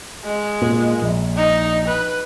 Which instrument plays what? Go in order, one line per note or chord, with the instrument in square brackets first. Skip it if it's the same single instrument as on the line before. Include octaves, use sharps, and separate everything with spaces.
[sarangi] G#3
[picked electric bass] A#2
A#1
[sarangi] D#4
B4